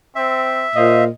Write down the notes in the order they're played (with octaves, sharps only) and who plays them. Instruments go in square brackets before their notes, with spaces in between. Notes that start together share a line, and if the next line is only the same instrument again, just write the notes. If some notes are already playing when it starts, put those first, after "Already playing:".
[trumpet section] C4 [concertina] E5
[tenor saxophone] A#2 [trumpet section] C5 F5 [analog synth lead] D#5